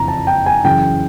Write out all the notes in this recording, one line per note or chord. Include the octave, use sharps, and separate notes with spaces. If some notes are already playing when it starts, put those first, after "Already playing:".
Already playing: F#1 F2 E3 A#5
A5
G5
G#5
F#2 C#3 E3 G5